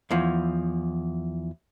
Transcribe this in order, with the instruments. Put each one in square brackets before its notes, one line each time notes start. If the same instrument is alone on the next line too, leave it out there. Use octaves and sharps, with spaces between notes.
[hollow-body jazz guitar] E2 E3 F3